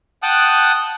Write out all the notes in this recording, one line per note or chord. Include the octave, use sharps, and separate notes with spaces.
F#5 G5 A5 D#6 F#6